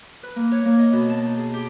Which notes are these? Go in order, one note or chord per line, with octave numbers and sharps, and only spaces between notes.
B4
A#3
C#5
A#3
D#5
B2
A5
D#4
G#4
G4